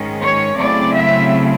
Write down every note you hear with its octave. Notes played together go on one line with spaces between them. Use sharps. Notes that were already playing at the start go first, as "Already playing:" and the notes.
Already playing: G#2 D#3 G#3 C#4
C#5
C#3 F#3 A3 C4 E4 D5
E5